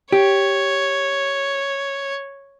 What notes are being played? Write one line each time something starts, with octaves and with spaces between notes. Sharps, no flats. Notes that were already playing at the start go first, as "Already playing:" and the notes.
G4 C#5